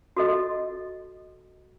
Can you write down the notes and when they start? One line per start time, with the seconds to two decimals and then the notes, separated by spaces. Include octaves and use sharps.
0.17 F#4 A4 D#5